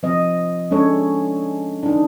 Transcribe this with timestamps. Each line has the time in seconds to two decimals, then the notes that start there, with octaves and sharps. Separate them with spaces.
0.03 F3 C4 D#5
0.71 G#3 C#4 D4 A4 C#5
1.83 D4 D#4